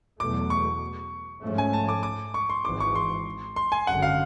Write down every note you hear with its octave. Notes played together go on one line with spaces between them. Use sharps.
E2 B2 F#3 A3 D6
C#6
G#2 F3 A3 C#4
G#5
A5
D6
D6
C#6
C6
G#1 G#2 E3 D6
C#6
C6
C6
G#5
G#1 F#2 D3 F#5
F5